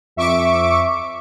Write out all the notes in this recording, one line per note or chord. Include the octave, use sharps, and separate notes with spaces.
F2 E5 C#6 D6 D7